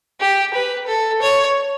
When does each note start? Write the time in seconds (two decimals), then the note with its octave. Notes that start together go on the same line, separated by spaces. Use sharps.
0.21 G4
0.54 B4
0.88 A4
1.22 C#5